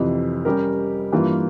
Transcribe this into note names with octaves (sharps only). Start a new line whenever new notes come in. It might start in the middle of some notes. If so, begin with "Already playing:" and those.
Already playing: F2 C3 E3
G3 C#4 G4 A#4
G2 E3 A#3 F4